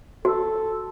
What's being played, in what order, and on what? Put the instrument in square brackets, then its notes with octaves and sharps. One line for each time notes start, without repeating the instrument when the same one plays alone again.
[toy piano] F#4 [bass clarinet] A4